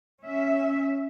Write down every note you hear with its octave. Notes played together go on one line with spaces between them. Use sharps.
C#4 E5